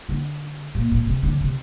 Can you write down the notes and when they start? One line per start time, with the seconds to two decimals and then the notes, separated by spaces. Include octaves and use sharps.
0.09 D3
0.75 A#2
0.92 A#2
1.07 C3
1.23 D3
1.41 C3